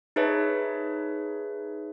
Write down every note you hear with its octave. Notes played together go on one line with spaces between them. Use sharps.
D#4 G#4 B4 C#5 E5 A5